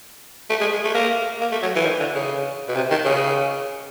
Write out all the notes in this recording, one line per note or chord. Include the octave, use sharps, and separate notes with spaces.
A3
G#3
G#3
A3
A#3
A#3
A3
F#3
E3
D#3
D3
C#3
B2
C3
D#3
C#3